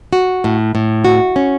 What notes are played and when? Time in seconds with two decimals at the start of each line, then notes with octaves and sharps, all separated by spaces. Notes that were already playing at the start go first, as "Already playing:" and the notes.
0.13 F#4
0.44 A2
0.75 A2
1.05 F#4
1.36 C#4